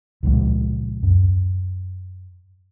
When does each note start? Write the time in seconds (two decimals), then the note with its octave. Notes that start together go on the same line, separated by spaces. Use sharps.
0.23 C#2 A#2 F3 G#3
1.03 F#2